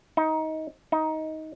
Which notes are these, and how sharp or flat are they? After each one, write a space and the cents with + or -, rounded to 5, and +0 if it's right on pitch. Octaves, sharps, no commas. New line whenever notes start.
D#4 +20
D#4 +15